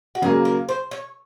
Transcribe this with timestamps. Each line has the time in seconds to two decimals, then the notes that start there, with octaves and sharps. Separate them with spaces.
0.15 F#4
0.22 C#3 F#3 A#3 G#4
0.45 A#4
0.69 C5
0.91 C#5